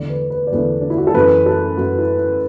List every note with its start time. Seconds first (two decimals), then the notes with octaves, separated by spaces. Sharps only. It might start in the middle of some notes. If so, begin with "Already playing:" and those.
Already playing: E2 D3 A3 D5
0.09 B4
0.30 B4
0.47 D5
0.52 E2 D3 A3 B4
0.81 D4
0.90 E4
0.97 F#4
1.07 A4
1.14 F#2 E3 A3 B4
1.46 A4
1.77 F#2 E3 A3 F#4
1.98 E4
2.19 E4